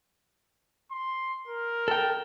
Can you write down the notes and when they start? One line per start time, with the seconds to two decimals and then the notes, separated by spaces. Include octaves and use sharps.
0.91 C6
1.48 A#4
1.88 A4 G5